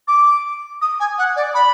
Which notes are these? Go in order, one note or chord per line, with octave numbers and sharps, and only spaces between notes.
D6
D#6
G#5
F#5
D5
B5